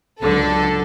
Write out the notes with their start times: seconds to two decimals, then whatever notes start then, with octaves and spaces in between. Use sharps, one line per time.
0.22 C#2 D3 F#3 A4